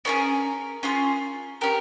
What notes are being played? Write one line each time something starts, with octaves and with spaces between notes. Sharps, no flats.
C#4 F4 G#4 A#4
C#4 F4 G#4
C#4 G4 A#4